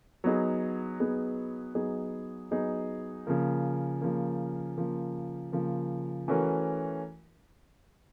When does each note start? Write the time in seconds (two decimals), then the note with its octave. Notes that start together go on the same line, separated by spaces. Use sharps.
0.24 F#3 B3 D#4 G#4
1.00 F#3 B3 D#4 G#4
1.75 F#3 B3 D#4 G#4
2.51 F#3 B3 D#4 G#4
3.27 C#3 F3 A#3
4.01 C#3 F3 A#3
4.77 C#3 F3 A#3
5.52 C#3 F3 A#3
6.28 E3 A3 C#4 F#4 A#4